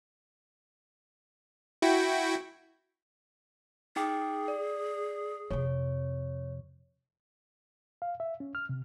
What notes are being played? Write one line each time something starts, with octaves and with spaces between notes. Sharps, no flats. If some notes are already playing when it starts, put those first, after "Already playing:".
E4 F#4 G5
D#4 G#4 G5 D6
D5
F2 C3 C#5
F5
E5
C#4
F6
C3